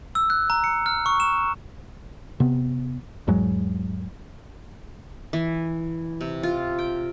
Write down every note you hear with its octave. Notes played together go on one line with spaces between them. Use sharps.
E6
F#6
A#5
C#7
F6
C#6
E7
C3 B3
E2 G#2 F#3 G#3
E3
C3
F4
G5